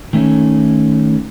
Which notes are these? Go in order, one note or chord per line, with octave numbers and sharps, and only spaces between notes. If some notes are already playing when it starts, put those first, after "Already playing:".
D#3 A3 C#4